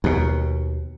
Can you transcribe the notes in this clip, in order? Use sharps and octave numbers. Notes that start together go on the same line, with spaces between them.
D#2 B2